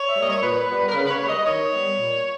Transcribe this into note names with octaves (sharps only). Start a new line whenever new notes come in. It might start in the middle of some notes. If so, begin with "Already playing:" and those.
Already playing: C#5
E5
G3 A#3 D#5
C#5
A#2 B4
G3 B3
A#4
C#3 B4
B4
C#5
G3 A#3
D#5
D#3 C#5
G3 B3
A#2